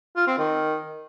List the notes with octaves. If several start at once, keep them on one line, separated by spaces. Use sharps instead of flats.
F4
C4
D#3